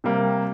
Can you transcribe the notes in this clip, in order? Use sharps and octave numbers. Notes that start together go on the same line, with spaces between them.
C3 G3 A#3